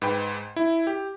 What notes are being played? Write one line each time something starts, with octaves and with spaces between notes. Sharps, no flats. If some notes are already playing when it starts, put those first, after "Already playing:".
G#2 B4 G5
E4
G4